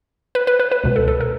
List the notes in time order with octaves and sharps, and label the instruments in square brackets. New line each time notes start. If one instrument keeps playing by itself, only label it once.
[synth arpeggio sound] B4
B4
B4
B4
C#2 B2
A4
A4
A#4